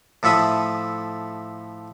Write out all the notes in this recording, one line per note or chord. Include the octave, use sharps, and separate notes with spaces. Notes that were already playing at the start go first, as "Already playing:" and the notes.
A2 F3 A4 E5 B5 D#6